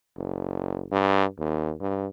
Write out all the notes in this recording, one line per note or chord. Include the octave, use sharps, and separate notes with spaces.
F#1
G2
D#2
G2